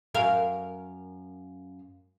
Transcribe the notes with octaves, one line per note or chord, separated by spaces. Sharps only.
F#2 A#4 F5